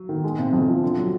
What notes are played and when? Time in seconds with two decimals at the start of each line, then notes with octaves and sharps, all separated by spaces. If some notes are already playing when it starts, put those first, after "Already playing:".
Already playing: F#3
0.09 D#3
0.24 G#3
0.38 C3
0.53 F2
0.68 F3
0.83 D3
0.98 F#3